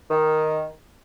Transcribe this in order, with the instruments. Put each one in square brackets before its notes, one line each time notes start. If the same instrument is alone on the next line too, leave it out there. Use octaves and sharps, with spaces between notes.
[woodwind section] D#3